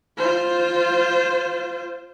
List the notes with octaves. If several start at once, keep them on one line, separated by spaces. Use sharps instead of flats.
F4 C5